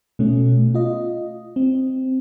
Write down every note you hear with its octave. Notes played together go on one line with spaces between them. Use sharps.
B2 A3 C#4
F4 D#5
C4